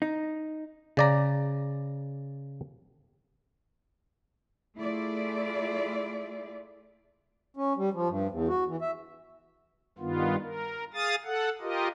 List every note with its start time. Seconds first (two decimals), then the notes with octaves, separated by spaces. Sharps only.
0.02 D#4
0.97 C#3 D5 A#5
4.77 A3 E4 F4 G#4 D5
7.57 C#4
7.77 G3
7.94 F3
8.09 G2
8.31 E2
8.48 F#4
8.68 E3
8.82 E5
9.98 G2 D#3 B3 F4
10.42 A#4
10.94 G#4 F5 D#6 A6
11.25 A4 F#5
11.61 F4 G4 A#4 D#5